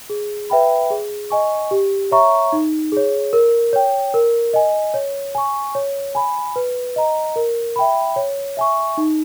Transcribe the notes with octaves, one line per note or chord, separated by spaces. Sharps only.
G#4
B4 E5 G5 B5
G#4
D#5 G#5 C#6
G4
C#5 E5 A#5 C#6
D#4
G#4 C#5
A#4
C#5 G5
A#4
D#5 G#5
C#5
G#5 C#6
C#5
G#5 B5
B4
D#5 A#5
A#4
E5 G5 B5
C#5
E5 G#5 C#6
D#4